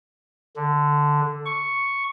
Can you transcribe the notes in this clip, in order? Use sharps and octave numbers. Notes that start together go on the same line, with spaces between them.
D3
C#6